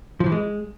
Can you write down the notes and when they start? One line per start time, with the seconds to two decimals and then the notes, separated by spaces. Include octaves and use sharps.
0.20 F3
0.26 E3
0.32 G#3